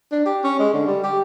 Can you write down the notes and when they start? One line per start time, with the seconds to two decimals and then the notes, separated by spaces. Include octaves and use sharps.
0.12 D4
0.26 G4
0.44 C#4
0.59 G#3
0.73 D3
0.87 G3
1.03 G4